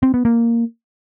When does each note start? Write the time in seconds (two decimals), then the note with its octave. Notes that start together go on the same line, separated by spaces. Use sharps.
0.03 C4
0.14 B3
0.25 A#3